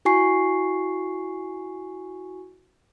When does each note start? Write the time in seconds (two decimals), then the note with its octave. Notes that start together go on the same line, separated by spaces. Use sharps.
0.05 E4 F#4 G#5 C#6 C7